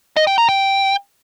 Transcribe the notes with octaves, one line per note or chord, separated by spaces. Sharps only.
D#5
G5
A#5
G5